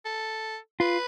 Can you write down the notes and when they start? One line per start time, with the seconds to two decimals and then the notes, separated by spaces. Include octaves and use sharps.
0.06 A4
0.80 F4 B4